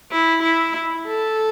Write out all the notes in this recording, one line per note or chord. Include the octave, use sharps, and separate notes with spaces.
E4
E4
A4